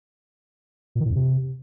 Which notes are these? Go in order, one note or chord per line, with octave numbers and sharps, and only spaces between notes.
A#2
D#3
A2
F2
C3